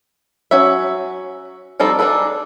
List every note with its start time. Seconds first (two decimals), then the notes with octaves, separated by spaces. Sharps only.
0.51 F#3 C#4 F#4 E5
1.80 F3 G3 C4 D#4 A4
1.99 D4 D#4 G#4 A4 B4